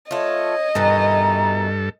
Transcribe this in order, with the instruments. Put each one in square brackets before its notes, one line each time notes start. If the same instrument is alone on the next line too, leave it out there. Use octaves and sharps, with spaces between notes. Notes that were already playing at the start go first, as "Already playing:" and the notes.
[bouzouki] A3 F4 [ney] C#5 [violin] D#5
[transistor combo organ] G2 A4 [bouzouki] B2 D#3 E3 [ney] A#5